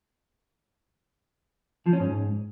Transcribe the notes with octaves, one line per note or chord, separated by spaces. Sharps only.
F3
C#4
G#2